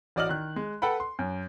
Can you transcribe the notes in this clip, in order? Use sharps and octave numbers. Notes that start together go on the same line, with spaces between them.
A1 F#4 D5 D#5 F6 F#7
D#3 F#6
G#3
A4 B4 F#5 G5 B5
C6
F#2